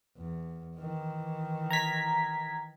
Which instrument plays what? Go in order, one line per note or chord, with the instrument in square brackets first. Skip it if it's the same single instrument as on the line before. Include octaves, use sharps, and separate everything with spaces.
[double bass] E2
D#3 E3
[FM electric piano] A#5 G#6 B6